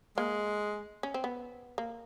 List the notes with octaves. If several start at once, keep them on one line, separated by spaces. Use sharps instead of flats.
G#3 A#3
C#4
C4
B3
A#3